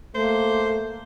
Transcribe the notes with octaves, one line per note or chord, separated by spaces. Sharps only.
A3 A#3 C5